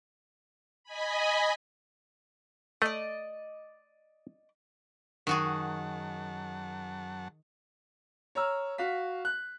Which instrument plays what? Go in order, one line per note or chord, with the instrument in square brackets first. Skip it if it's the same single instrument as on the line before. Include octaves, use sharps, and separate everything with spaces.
[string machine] D#5 G#5 B5
[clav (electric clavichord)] A3 [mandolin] D5 D#5
[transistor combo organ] F#2 F#5 A5 [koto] D#3 F#4 G#4
[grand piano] C#5 A#5 E6 F6
F#4 F5 B6
F#6